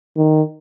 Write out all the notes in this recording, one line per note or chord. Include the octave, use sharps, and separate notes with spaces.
D#3